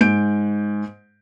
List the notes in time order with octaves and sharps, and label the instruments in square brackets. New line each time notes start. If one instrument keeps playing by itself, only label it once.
[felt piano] G#2 G6 D7